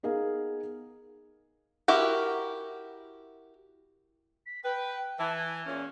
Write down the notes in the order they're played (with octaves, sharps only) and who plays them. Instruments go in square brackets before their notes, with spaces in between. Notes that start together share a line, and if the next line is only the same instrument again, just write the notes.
[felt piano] B3 D#4 G#4 A#4 F5
[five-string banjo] E4 F#4 G4 A#4
[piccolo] B6
[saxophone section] B4 [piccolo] G5
[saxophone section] E3 [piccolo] A5
[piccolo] G#6
[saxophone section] E2 A#2 C#4